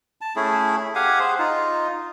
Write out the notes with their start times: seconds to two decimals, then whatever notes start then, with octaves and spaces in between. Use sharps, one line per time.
0.21 A5
0.36 A3 C#4 E4 G#4
0.95 G4 F5 F#5 G#5
1.20 G#4 C5
1.39 D#4 F4